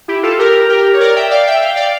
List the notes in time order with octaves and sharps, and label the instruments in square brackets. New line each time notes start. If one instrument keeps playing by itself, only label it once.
[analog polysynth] E4 G4
F4 A4
G4 A#4
G4 A#4
C#5
A#4 D5
E5 G5
D5 F5
E5 G5
F5
G5
D5 F5